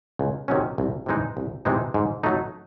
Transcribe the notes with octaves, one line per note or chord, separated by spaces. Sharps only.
C#2
C3 D#3 F#3 C#4
C2
C3 E3 G#3 D#4
C2
C3 E3 G#3 D#4
G#2
F#3 A3 D#4